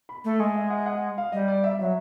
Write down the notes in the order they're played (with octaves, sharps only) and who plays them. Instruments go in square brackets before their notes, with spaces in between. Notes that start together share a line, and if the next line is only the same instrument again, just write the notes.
[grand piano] B5
[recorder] A3
G#3
[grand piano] E5
F#5
F#5
F5
[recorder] G3 [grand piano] D#5
[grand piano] D5
E5
[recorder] F#3 [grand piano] E5